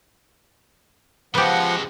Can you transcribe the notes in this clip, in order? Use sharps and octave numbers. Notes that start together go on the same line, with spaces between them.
C#3 F3 G#3 B3 G4 F#5